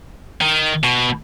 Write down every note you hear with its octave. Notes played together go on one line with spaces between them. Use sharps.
D#3
B2